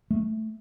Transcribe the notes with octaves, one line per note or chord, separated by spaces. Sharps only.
A3